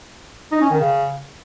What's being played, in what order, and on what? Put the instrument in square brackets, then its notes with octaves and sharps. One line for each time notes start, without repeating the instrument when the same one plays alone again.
[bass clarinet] D#4
C#4
D#3
C#3